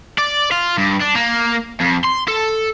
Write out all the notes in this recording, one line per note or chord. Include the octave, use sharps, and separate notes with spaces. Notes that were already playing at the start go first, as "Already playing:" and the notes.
D5
F4
G2
D4
A#3
F2
C6
A4